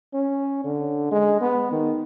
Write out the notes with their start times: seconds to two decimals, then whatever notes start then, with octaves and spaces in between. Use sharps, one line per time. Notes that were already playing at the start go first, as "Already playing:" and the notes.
0.14 C#4
0.64 D3
1.12 G#3
1.41 B3
1.72 D#3